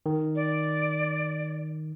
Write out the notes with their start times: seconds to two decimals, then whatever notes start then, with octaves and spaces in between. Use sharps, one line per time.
0.06 D#3
0.36 D5